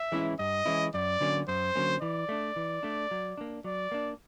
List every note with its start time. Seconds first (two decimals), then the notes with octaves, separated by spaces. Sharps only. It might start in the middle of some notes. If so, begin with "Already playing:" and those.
Already playing: E5
0.12 E3 G#3 C#4 E4
0.39 G2 D#5
0.66 E3 G#3 C#4 E4
0.94 F#2 D5
1.21 D3 F#3 A#3 C#4
1.48 F#2 C5
1.75 D3 F#3 A#3 C#4
2.01 E3 D5
2.29 A3 D4
2.56 E3
2.83 A3 D4
3.11 F#3
3.38 A#3 D4
3.64 F#3 D5
3.92 A#3 D4